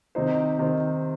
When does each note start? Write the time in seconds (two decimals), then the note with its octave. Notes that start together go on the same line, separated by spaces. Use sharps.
0.15 C3 D#3 C4 D#4 C5
0.59 C3 D#3 C4 D#4 C5